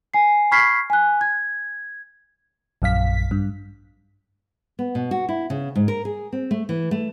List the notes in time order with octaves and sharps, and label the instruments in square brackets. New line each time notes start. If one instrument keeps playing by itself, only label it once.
[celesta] G#5 C7
B5 C#6 F6 G#6 B6 C7
G#5 F#6
G#6
[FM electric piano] A#1 F#2 F5 B6
G2
[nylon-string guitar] B3
B2
F#4
E4
C#3
G#2
A#4
G#4
C4
A3
E3
A3